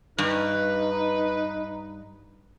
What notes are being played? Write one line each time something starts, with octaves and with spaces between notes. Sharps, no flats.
G2 D#4 B4